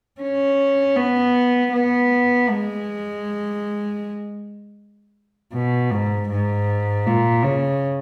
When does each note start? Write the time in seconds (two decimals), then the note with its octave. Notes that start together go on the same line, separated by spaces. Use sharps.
0.21 C#4
0.96 B3
1.72 B3
2.50 G#3
5.53 B2
5.91 G#2
6.29 G#2
7.06 A#2
7.43 C#3